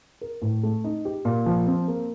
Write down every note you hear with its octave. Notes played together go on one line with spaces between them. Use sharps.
A#4
A2
A3
D#4
G4
A#2
F3
C4
A#3